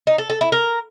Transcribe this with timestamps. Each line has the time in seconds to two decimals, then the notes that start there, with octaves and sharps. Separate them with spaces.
0.07 D#4
0.18 A4
0.30 A4
0.41 E4
0.52 A#4